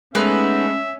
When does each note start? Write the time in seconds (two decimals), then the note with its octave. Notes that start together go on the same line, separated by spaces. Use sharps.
0.15 G#3 A3 B3 C#4 D#4 B4 E5